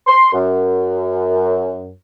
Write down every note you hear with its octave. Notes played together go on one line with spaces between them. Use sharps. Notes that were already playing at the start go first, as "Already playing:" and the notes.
C6
F#2